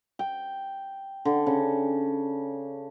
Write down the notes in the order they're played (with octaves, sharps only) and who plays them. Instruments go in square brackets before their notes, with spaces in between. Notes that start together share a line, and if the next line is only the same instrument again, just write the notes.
[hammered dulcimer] G5
D3
C#3